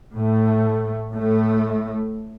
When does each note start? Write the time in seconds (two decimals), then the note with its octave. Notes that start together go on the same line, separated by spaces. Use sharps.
0.14 A2 A3
1.12 A2 A3